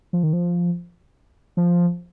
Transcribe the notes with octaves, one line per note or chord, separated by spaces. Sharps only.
F3
D#3
F3
F3